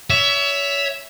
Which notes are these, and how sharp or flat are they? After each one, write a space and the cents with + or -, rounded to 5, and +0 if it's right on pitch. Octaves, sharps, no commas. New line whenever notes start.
C#5 +30 E5 +0